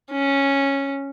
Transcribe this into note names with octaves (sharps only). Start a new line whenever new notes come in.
C#4